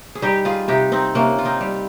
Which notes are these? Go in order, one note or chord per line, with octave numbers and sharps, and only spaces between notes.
G#4
G3 D#4 G4
F4 G#4
C3 D#4 G4
C4 D#4
C3 A#3 C#4
F4
C4 D#4
G3